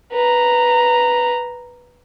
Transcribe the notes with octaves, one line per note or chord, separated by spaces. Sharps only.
B4 A#5